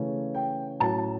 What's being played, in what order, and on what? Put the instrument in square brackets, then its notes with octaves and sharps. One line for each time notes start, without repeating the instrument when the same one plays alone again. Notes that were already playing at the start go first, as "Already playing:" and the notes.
Already playing: [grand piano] C#3 E3 A3 C#4
G5
A2 F#3 C#4 A5